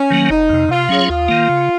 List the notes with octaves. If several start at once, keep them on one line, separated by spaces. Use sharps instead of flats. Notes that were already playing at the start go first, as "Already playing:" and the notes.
Already playing: C#4
D#3 F#3 A#3
F#1 D#4
F2 C3
C3 F4
F#3 C#4 G#4 C#5
D#2 F4
D#3 A#3
C#3